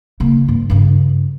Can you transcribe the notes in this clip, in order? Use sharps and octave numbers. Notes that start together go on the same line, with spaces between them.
C#3 A#3
G#2
G2 C#3